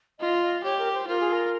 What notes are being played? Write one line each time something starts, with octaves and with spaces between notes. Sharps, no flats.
F4 D#5
D#5
G4 C#5
A#4
C5
F4 A#4
G#4
A#4